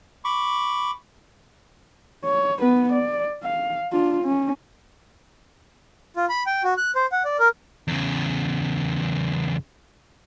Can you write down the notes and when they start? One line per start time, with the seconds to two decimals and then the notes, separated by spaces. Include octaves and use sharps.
0.24 B5 C#6 D6
2.25 C#5
2.59 B3 B4
2.93 D5
3.43 F5
3.93 D4 F4
4.23 C#4
6.16 F4
6.29 B5
6.46 G5
6.64 F#4
6.77 F#6
6.95 C5
7.12 F#5
7.25 D5
7.39 A#4
7.88 E2 C#3